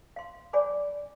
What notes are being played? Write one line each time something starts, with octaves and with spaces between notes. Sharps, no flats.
F5 C6
C#5 D5 G#5 B5 D6